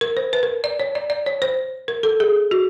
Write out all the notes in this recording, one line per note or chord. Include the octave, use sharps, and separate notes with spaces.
A#4
C5
B4
A#4
D5
C#5
D5
D5
C#5
C5
A#4
A4
G#4
F#4